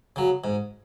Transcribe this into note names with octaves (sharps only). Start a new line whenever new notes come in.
C#3 F#3
G#2